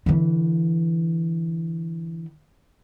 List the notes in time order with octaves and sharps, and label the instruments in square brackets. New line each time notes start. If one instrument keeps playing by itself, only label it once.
[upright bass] D3 E3